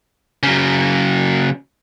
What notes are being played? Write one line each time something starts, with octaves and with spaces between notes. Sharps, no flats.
C#3 F#3